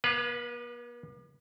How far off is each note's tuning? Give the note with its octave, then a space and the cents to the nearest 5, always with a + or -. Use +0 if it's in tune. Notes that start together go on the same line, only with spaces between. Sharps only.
B3 -45 B4 -5 F5 +10